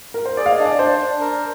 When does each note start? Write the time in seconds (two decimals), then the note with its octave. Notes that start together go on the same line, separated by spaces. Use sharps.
0.14 A#4
0.26 C5
0.37 G#4 D5
0.46 F5
0.51 D#5
0.59 D4
0.65 D5
0.79 D4 C5
1.00 D4
1.20 A#4